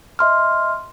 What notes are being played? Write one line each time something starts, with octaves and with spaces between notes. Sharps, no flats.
D#5 E5 C6 F6